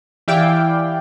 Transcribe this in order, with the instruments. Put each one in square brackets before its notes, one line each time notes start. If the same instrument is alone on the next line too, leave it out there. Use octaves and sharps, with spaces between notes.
[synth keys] E3 E4 G4 D5 F5 G5